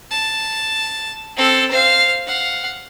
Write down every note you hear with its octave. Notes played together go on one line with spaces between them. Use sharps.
A5
C4 A4
C5 F5
F5 F#5